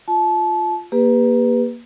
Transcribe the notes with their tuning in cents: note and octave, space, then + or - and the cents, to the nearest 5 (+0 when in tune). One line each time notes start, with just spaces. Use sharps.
F4 +0 A5 -30
A#3 +15 G4 +40 B4 +0